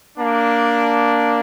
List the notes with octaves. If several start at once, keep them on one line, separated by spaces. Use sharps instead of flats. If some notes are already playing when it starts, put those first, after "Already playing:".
A#3 D4